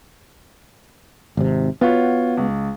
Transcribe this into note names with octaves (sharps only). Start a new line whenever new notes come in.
G#1 C3
B3 F4 F#4 C#5
C#2